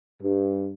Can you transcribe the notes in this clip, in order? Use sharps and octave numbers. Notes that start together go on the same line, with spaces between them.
G2